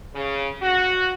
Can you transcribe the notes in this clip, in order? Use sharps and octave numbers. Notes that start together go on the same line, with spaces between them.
C#3
F#4